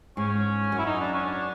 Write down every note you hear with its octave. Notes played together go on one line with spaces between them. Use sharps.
G#2 C#4
F#2
E4
D#4
D4
C#4
D4